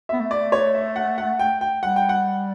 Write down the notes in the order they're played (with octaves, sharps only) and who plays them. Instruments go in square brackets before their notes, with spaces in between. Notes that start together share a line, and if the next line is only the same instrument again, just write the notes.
[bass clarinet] B3 [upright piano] E5
[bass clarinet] A3
[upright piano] D5
C#5
E5
F#5
F#5
G5
G5
[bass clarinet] G3 [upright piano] F#5
[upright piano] G5
F#5